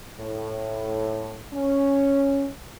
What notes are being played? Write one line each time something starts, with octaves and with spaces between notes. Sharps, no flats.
A2
C#4